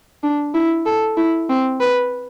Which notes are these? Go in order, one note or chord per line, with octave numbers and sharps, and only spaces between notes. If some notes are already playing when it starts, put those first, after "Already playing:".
D4
E4
A4
E4
C4
B4